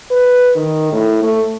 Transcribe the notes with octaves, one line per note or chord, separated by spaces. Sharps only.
B4
D#3
A2
A3